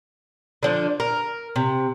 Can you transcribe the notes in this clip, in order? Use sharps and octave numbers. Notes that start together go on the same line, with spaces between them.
D3 F3 D4
A#4
C3